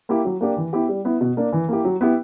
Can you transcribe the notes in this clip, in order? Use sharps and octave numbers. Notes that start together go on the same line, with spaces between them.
A#3 E4 G4
F#3
A#3 D4 G4
E3
B3 E4 G4
G3
B3 E4
B2
A#3 D4
E3
A#3 E4 G4
F#3
B3 E4 G4